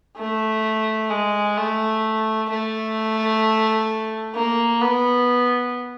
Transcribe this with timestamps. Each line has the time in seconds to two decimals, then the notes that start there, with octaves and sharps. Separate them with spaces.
0.17 A3
1.10 G#3
1.57 A3
2.50 A3
4.35 A#3
4.81 B3